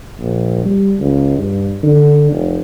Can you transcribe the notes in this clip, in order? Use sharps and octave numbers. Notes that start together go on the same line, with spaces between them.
A#1
G3
C#2
G2
D3
F1